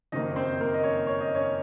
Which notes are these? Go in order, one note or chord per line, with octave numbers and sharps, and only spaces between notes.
F#1 F2 D#3 A#3 D#4 D#5
C4 C5
A#3 A#4
D#5
C#4 C#5
C#5
D#5
C#4 C#5